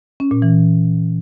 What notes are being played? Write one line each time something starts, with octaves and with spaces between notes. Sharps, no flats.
C#4
A#2
E3